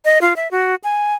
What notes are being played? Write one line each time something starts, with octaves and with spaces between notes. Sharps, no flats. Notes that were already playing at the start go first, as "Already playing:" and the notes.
D#5
F4
E5
F#4
G#5